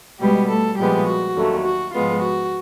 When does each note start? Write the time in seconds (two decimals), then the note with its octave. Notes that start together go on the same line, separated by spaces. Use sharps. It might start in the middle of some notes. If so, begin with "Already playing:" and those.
0.19 B2 G3 G#3 B3 G4
0.48 A3 A4
0.77 A#2 F3 G3 G#3 B3 G4
1.07 F#4
1.36 D#2 D3 F#3 A3
1.65 F#4
1.94 G#2 F3 G#3 B3 F4
2.23 F#4